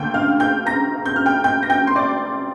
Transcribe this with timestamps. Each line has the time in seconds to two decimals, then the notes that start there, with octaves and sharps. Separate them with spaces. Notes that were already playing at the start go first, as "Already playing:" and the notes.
Already playing: D2 D3 A#3 G5 G6
0.14 F5 F6
0.40 G5 G6
0.66 A#5 A#6
1.06 G6
1.16 F6
1.26 G5 G6
1.44 G5 G6
1.63 A#6
1.70 G5 G6
1.87 C6
1.96 D5 D6